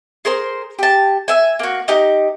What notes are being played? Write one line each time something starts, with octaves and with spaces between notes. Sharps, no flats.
G#4 A#4 C5 C6
G4 A5
E5 G#5
A#3 F#4
D#4 G4 A#5